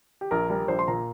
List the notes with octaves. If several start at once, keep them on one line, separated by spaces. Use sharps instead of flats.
G4
A#1 A#4
G3 A#4
A#1 C5
C6
A#2 A#5